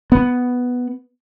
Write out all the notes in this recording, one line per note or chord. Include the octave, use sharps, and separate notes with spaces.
B3